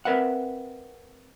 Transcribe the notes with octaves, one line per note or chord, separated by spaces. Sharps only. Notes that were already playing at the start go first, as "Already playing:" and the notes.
C4 A#4 B4 E5 F#5